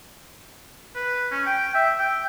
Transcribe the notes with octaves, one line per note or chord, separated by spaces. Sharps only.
B4
C#4
G5
E5
G5